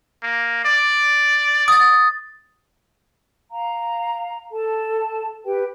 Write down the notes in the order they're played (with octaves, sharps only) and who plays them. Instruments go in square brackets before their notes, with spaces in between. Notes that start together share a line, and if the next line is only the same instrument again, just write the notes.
[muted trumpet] A#3
D5
[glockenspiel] D#6 A6
[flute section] F5 A#5
A4 A5
G4 B4 G5